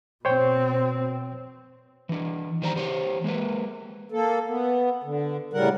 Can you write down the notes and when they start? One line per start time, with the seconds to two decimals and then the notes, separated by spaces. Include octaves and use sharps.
0.25 B2 C4 C5 C#5 G5
2.09 E3 D4
2.62 D#3 G3 C5 D5 G#5 A#5
2.75 E3 G4 C5 C#5
3.24 G#3 A#3 A#4 B4
4.12 A#3 A4
4.48 B3
5.04 D3
5.53 A2 C#3 G3 A#4 F#5